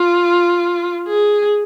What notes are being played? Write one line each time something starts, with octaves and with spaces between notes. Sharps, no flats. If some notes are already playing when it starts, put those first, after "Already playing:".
Already playing: F4
G#4